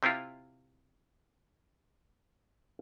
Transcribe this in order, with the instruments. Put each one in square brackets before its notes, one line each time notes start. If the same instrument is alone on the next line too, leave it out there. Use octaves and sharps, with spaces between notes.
[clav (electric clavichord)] C3 C4 E4 F4